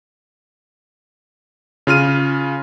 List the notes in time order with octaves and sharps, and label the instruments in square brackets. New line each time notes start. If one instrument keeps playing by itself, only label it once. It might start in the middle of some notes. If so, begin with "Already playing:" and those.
[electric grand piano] C#3 F4 F6 D#7